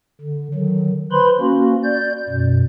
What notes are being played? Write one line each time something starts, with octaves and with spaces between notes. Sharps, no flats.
D3
D3 D#3 F#3
B4 C5 B5 C6
A#3 C#4 F#4
D5 G6
F#2 B2